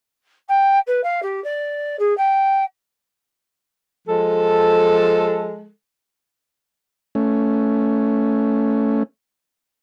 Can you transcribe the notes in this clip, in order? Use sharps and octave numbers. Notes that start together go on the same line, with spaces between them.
G5
B4
F5
G4
D5
G#4
G5
F3 G#3 A4
A3 C#4